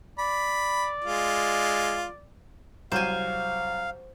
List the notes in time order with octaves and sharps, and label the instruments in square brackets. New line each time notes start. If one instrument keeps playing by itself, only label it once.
[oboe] D5 [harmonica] B5
[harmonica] G#3 F4
[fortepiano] C2 F#3 [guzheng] C5 G#5 [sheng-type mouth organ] F5